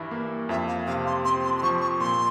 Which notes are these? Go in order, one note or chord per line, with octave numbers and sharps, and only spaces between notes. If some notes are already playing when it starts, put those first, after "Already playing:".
Already playing: G2 E3 E4
A#3
F2 E5
F5
C3 F5
C6
C4 C6
C6
C6
F3 C#6
C#6
A#2 C6